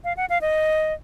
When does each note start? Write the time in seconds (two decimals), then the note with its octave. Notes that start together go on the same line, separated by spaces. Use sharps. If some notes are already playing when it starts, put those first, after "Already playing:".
0.04 F5
0.17 F#5
0.30 F5
0.41 D#5